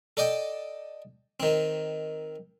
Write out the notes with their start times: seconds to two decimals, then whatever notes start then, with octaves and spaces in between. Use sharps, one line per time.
0.17 A4 D5 D#5 G5
1.40 D#3 C4